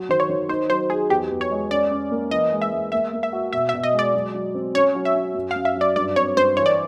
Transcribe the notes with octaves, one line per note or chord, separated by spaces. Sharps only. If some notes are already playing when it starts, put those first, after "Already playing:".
Already playing: F#3
D#3 C5
C#5
D#3
D#4 C5
F#3 C5
D#4 G#4
E2 G4
E2
C#5
G#3
C#4 D5
C#4
A#3
E3 D#5
G#3
E5
G#3
A#3 E5
A#3
E5
F#4
B2 E5
B2 E5
D#5
G#3
D5
F#3
F#3
C4
C#4 C#5
F#3
E5
C#4
F#2
F#2 F5
E5
F#3
D5
G2 D5
C4 C#5
G2 C5
E3 C#5
D5